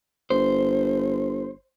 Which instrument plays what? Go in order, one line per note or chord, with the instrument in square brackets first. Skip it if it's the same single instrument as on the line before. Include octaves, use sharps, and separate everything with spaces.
[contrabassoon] G1 [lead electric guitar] C5